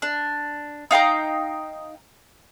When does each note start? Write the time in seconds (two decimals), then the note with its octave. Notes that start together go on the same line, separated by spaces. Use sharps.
0.02 D4
0.91 D#4 F5 G5 A#5